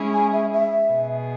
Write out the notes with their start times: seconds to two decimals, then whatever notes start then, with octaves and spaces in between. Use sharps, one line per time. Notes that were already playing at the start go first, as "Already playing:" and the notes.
Already playing: G#3 C#4 E4 G#4
0.13 G#5
0.33 E5
0.53 E5
0.91 B2 B3 G#4